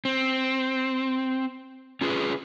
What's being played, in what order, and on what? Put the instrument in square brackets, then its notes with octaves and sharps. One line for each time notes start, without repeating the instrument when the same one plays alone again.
[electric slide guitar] C4
C#4 F4 G#4 B4